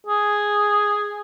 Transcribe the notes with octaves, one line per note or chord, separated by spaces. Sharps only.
G#4